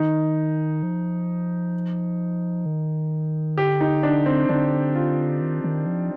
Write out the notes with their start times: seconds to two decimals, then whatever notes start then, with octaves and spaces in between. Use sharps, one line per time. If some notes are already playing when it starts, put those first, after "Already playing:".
Already playing: D#3 D#4
0.83 F3
2.66 D#3
3.58 D3 G4
3.81 D#4
4.03 D4
4.26 C4
4.49 D3 D4
4.95 F4
5.40 D#3
5.64 D#3
5.86 F3